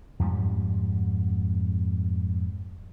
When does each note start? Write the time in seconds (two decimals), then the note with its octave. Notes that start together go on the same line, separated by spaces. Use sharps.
0.20 F2 G#2 G3